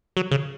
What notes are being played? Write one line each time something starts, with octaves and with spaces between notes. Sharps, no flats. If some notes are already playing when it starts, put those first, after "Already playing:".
F#3
C#3